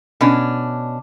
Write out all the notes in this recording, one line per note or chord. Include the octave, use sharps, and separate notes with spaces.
B2 C#4 D4